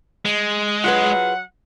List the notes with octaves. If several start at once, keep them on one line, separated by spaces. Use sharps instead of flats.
G#3
F#3 F4 G#4 B4 F#5